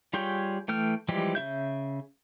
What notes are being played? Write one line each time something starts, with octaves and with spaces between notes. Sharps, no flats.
G3 F4 G#4 C#5 G5
E3 A3 G5 F6
E3 F3 G3 G#3 G4
C#3 F4 E5 G6